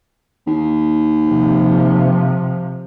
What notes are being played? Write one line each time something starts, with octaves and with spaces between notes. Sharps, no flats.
D#2
C3 F3